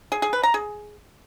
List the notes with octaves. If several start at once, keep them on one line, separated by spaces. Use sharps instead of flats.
G#4
G#4
B4
A#5
G#4